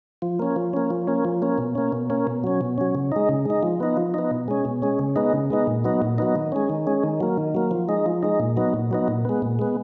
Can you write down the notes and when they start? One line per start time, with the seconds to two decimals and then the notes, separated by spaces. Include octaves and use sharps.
0.22 F3
0.39 A#3 C#4
0.56 F3
0.73 A#3 C#4
0.90 F3
1.07 A#3 C#4
1.25 F3
1.42 A#3 C#4
1.58 B2
1.75 A#3 C#4
1.92 B2
2.10 A#3 C#4
2.27 B2
2.44 F#3 C#4
2.61 B2
2.78 F#3 C#4
2.95 C#3
3.12 G#3 D#4
3.29 C#3
3.45 G#3 D#4
3.63 F3
3.80 B3 D#4
3.97 F3
4.14 B3 D#4
4.31 B2
4.48 G#3 C#4
4.65 B2
4.82 G#3 C#4
4.99 C#3
5.16 G#3 B3 D#4
5.33 C#3
5.50 G#3 B3 D#4
5.67 A#2
5.84 F#3 B3 D#4
6.02 A#2
6.18 F#3 B3 D#4
6.36 D#3
6.52 G#3 C#4
6.70 D#3
6.87 G#3 C#4
7.03 D#3
7.20 F#3 A#3
7.37 D#3
7.55 F#3 A#3
7.71 F3
7.89 G#3 D#4
8.06 F3
8.23 G#3 D#4
8.40 A#2
8.57 F#3 B3 D#4
8.74 A#2
8.91 F#3 B3 D#4
9.08 A#2
9.25 G#3 B3
9.42 A#2
9.59 G#3 B3